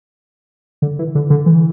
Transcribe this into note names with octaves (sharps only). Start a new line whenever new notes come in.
D3
E3
D3
D3
E3